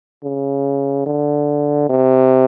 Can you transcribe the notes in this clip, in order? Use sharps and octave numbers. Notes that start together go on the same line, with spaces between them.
C#3
D3
C3